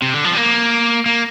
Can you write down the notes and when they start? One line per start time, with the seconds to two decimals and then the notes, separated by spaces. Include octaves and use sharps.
0.02 C3
0.14 D3
0.24 F3
0.32 G3
0.37 A#3
1.06 A#3